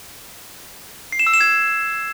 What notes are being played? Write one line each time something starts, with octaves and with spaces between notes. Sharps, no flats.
C7
E7
E6
E7
G#6